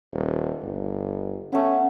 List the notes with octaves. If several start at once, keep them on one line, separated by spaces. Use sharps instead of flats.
D#1
G1
A3 B3 C#4